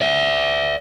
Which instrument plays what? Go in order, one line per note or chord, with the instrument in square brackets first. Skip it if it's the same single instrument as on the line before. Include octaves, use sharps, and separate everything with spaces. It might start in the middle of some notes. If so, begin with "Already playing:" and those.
[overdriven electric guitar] D5 E5